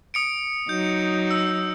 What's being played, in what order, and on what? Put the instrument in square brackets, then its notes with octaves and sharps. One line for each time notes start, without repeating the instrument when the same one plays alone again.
[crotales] D#6 C#7 D7
[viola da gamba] F#3 D#4 [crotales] G6
[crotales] E6